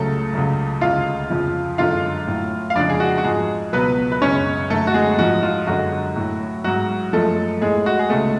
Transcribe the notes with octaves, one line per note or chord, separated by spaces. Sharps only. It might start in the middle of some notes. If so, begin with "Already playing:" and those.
Already playing: C#2 C#3 F#3 A3 A4
C#2 C#3 F#3
D2 C#3 G#3 F4 F5
F2 C#3 F3
F#2 D3 G#3 F4 F5
A2 F#3
F5
F2 C#3 G#3 D4 D5
G#4
F#4
F#4
G#2 F3 G#3 G#4
C#2 B2 F#3 B3 B4
B4
F#2 C#3 G#3 C#4 C#5
F#2 D3 F#3 A3 A4
F#4
G#3 G#4
G#2 F3 G#3 F#4
F4
F#2 D3 G#3 F#4
A2 F#3
G#2 F#3 F#4
F#2 F3 G#3 A3 A4
A2 G#3 G#4
F#4
G#4
C#2 C#3 G#3 A3 A4